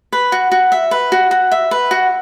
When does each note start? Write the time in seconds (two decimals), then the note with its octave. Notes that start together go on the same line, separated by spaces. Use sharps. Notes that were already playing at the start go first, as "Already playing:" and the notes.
0.13 B4
0.32 F#4
0.52 F#4
0.72 E5
0.91 B4
1.12 F#4
1.31 F#4
1.52 E5
1.71 B4
1.91 F#4